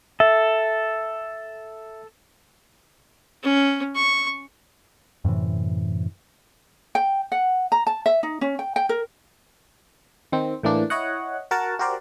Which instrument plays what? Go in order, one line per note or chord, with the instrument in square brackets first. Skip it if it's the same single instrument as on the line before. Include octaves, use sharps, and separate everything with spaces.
[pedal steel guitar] A4 [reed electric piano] E5
[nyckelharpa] C#4
C#6
[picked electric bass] F#2 A2 C3 E3
[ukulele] G5
F#5
A#5
A5
E5
D#4
C#4
G5
G5
A#4
[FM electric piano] D#3 C4
A2 E3 A#3 D4
E4 C#5 D#5 F#5
F#4 A#4 F#5 A5
F#4 G4 A#4 C5 D5